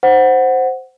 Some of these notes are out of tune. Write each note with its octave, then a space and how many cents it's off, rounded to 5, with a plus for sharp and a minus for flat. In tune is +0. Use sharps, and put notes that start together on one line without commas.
C5 +0 F#5 +0